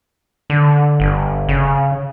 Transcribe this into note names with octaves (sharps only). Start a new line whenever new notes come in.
D3
G1
C#3